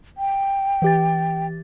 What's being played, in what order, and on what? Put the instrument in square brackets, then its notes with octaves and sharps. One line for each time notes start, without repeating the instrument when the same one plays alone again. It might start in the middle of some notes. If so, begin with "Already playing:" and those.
[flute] G5
[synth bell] E3 G4 A6